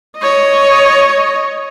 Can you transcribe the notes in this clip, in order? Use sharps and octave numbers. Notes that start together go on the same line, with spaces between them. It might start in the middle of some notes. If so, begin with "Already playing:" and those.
C#5 D#5